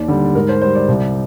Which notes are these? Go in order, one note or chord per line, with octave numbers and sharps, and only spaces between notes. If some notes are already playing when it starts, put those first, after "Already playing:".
Already playing: D#2 D5
D3 G3
G#2 A#4
C5
G3 C5
D5
C2